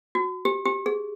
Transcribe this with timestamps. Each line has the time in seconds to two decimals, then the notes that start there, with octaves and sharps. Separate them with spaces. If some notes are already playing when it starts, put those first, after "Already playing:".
0.15 F#4
0.45 G4
0.65 G4
0.86 G#4